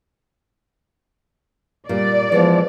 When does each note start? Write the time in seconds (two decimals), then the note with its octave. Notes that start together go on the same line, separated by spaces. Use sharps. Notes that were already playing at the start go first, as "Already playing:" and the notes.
1.89 A#2 G3 D5
2.32 E3 F3 G#3 B3